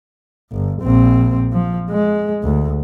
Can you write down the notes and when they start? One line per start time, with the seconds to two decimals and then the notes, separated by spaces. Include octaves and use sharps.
0.52 G1
0.82 A#1 C4
1.52 F3
1.90 G#3
2.43 D2